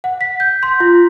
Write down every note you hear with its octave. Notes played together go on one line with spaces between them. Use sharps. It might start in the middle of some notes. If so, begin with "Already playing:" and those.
F#5
B6
G6
C6
F4